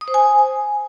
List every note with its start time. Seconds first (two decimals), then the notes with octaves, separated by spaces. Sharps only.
0.01 D#6
0.08 C5
0.14 G#5